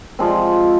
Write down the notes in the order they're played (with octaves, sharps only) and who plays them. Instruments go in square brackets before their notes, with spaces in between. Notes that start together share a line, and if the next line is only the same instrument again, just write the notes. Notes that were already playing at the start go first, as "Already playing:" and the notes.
[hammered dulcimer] C3 F3 G#3 C4